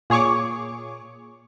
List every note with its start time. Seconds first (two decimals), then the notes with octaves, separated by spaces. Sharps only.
0.10 A#2 G#4 C#5 C#6 D6